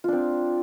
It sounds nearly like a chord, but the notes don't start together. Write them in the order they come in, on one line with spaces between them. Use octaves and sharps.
F4 D4 C4